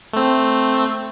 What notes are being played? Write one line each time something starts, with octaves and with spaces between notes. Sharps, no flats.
A3 C4